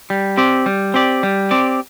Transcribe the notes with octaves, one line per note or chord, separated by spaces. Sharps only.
G3
C4 G4 D5
G3
C4 G4 D5
G3
C4 G4 D5